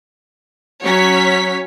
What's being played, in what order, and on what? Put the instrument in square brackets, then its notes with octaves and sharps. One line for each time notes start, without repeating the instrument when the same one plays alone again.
[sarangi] F#3 [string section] C#4 C#5 B6